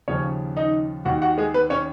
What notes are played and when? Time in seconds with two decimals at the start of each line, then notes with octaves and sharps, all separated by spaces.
0.08 D#2 C#3 F3 C#4 C#5
0.57 D#4 D#5
1.05 D#2 D#3 F#4 F#5
1.22 F#4 F#5
1.38 G#3 G#4
1.54 B3 B4
1.70 C#4 C#5